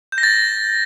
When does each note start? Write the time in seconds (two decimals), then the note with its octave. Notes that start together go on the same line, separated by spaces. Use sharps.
0.12 G6
0.18 A#6
0.23 A6